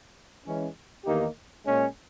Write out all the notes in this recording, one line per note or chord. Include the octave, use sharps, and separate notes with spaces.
E3 G#3 C#4
E2 D#3 A#3 D#4 G4
A#2 G#3 C#4